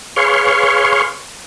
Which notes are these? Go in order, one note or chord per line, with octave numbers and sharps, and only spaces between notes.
G#4 B4 C#5 F5 C6 C#6